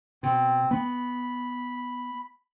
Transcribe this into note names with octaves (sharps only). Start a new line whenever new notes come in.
B2 C4
B3 B5